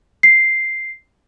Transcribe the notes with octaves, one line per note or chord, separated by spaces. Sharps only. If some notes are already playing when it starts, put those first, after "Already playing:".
C7